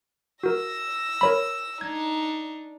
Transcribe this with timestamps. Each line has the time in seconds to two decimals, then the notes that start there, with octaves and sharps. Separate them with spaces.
0.43 F#4 A#4 E6 A#6
1.21 A#4 C#5 B5
1.81 D4 D#4 G#6